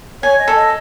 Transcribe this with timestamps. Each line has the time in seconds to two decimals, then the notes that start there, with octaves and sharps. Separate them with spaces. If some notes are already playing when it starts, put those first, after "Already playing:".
0.23 C#5 G#5
0.39 D#5
0.48 A4
0.56 D#5